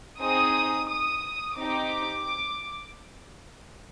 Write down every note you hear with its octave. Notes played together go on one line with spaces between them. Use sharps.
C4 D#4 G#4 D#6
D#6
C4 D#4 G4 D6